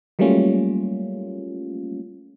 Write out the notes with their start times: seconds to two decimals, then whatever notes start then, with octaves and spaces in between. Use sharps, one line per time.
0.19 F#3 G3 A3 A#3 C#4 F4